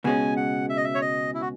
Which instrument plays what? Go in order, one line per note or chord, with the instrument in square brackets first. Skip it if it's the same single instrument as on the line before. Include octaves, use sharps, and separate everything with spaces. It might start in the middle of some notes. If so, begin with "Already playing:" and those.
[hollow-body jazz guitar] C#2 B2 G#3 C#4 [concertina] G#5
[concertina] F#5
E5
D#5
E5
C#5
D#5
E4
F#4